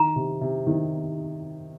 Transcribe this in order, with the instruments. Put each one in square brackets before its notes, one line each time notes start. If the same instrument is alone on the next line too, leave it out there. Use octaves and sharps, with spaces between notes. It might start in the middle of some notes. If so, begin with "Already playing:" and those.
Already playing: [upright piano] D#3 [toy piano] A#5
[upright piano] C3
C3
D#3